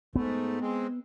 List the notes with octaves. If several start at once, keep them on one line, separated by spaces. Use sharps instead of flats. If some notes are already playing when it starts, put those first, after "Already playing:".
G#2 A3 B3
G#3 C4